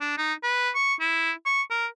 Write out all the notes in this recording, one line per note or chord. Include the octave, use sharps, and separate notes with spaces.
D4
D#4
B4
C#6
E4
C#6
A#4